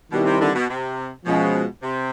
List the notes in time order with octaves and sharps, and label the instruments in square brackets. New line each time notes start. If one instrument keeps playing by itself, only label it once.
[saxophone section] B2 [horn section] D#3 G3 C4 E4
[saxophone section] C3
D3
B2
C3
[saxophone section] B2 [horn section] F3 G#3 C#4
[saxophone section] C3